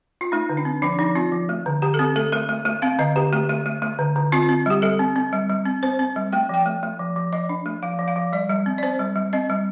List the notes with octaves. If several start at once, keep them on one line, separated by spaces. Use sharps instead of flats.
F4
A3 D#4
D3
D4
C4
F3 D4
F3 D#4
C4 F4
F3
A3
D3
D3 G4
A4
C4 G4
A3 A4
A3 A#4
A3
A3
C4 F5
D3 D#5
D3 G4
A3 G4
A3
A3
A3
D3
D3
C4 F4
C4
G3 G4
G3 A4
C4
C4
G3
G3
C4
C4 C5
C4
G3
A3 G5
F3 G5
A3
A3
F3
F3
F3 D#5
D4
A3
F3 F5
F3
F5
F3
G3 D5
G3
C4
D5
C4 C5
G3
G3
C4 D#5
G3